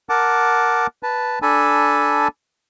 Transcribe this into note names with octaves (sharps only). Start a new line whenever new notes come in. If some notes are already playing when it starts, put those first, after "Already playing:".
A#4 F#5 A5 D6
B4 A5
D4 A4 G#5 A5 B5